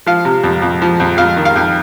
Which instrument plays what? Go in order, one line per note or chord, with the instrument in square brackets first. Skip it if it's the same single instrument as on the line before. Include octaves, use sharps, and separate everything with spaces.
[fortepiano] F3 F5
C3
F2
F2
F3
F2
F2 F5
D#3
F5
F2